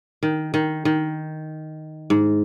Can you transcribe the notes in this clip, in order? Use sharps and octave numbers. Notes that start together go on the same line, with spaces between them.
D#3
D#3
D#3
G#2